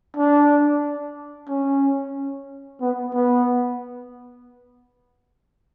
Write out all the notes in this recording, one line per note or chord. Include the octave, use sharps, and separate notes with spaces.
D4
C#4
B3
B3